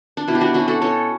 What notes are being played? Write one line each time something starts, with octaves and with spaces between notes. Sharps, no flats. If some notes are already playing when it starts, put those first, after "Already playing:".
D4
B2 E4
G4
D4 F#4
C#4 D4 F#4
F#4 A4
C#4 A4 C#5